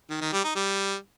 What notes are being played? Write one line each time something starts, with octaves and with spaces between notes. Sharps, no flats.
D#3
D#3
G3
D#4
G3